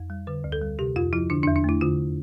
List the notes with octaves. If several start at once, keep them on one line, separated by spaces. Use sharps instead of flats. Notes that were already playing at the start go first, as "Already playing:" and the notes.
Already playing: F2
G3
D3 B4
D2
A4
G3
C3 G4
F2 F4
F3 E4
D3 D4
D4
E2
D4
A3 E4
D3 F4